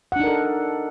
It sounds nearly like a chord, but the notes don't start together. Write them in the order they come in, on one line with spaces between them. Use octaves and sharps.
F#5 D4 D#4 A#4 A4